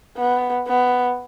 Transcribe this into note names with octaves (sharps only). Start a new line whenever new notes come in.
B3
B3